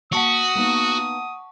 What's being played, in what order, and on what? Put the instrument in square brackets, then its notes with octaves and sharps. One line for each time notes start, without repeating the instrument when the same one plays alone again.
[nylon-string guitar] A#3 [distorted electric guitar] F#4 [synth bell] F#5 A5 C#6 [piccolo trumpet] D#6
[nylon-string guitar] A#3 B3 D#4